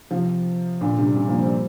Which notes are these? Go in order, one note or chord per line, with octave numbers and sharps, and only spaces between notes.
C3 F3
A#2 D3
G2 C3
G2 C3
F3 A#3
G3 C4